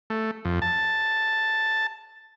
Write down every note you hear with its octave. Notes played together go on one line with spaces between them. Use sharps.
A3
F2
A5